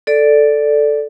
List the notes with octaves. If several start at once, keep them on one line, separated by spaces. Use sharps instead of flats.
A4 D5